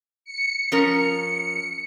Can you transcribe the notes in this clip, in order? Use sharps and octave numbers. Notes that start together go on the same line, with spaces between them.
C#7
F3 C#4 A#4